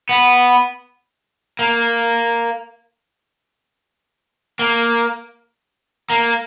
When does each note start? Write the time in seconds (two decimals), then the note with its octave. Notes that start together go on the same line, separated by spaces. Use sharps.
0.09 B3
1.59 A#3
4.59 A#3
6.10 A#3